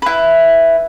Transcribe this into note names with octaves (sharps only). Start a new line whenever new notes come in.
E4 B4